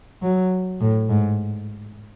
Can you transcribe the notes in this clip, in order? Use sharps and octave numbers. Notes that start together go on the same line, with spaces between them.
F#3
A2
G#2